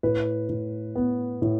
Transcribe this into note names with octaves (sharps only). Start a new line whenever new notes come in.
A2 B4
A2
B3
A2